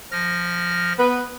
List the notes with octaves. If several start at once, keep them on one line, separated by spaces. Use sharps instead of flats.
F3 F6 A#6
B3 B4